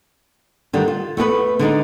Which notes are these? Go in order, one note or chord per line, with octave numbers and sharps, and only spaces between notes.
G2 D3 D#3 G3
F4
A3 B3 G#4 B4
D3 G#3 D4 D#4